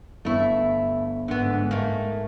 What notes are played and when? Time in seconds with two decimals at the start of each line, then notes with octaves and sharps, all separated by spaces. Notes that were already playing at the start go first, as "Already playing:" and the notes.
0.25 G1 A3 E4
1.28 G#2 D3 B3
1.71 A3 A#3